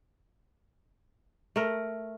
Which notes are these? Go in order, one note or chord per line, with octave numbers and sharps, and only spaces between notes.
A3 A#4